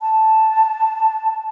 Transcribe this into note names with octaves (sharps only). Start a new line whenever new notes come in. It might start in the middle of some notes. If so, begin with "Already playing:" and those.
A5